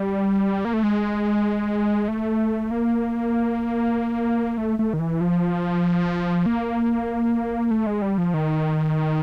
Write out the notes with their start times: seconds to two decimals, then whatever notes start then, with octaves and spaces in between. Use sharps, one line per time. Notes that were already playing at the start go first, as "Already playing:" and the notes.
Already playing: G3
0.65 A#3
0.74 A3
0.83 G#3
2.08 A3
2.71 A#3
4.58 A3
4.79 A3
4.93 D#3
4.99 E3
5.21 F3
6.46 A#3
7.71 A3
7.87 G#3
8.02 G3
8.18 F3
8.34 D#3